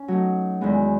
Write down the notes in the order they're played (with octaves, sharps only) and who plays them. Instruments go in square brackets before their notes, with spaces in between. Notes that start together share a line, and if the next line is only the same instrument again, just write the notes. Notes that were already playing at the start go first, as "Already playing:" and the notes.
Already playing: [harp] C#4
F#3 A3 D#4
E2 D#3 G#3 B3